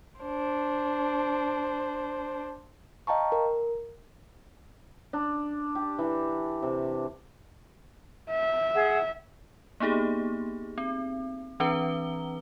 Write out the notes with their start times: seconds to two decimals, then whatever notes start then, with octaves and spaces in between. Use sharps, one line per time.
0.21 D4 C5
3.07 D#5 F5 G5 A5 A#5 C#6
3.32 A#4
5.13 D4
5.75 G4
5.99 E3
6.62 C3
8.31 E5
8.74 G#4 F#5
9.80 A#3 B3 D#4 G4 G#4
10.78 C4
11.60 E3 C4 D4 B4 A#5 G7